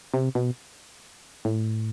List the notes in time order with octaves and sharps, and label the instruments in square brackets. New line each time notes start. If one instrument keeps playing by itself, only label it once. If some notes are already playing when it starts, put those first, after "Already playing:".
[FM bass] C3
B2
A2